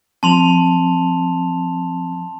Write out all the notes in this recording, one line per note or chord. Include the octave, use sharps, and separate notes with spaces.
F3 C4 A5 C6 F7